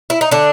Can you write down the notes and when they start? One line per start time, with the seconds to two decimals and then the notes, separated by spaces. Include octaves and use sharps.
0.10 E4
0.21 D#4
0.31 D3 D4